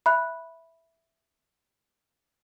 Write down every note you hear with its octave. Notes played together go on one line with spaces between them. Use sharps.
E5 B5 F#6